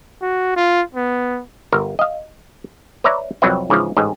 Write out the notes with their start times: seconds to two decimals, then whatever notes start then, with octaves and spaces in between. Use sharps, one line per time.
0.22 F#4
0.56 F4
0.95 B3
1.72 G1 A#4
1.99 D#5 F5
3.04 B4 C#5 D5 E5 A#5
3.42 C2 F2 F#3 C4 B4 E5
3.70 G#2 C#3 E3 F3
3.97 A1 G#2 D#5